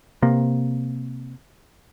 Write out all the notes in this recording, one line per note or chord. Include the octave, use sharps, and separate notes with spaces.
C3 A#3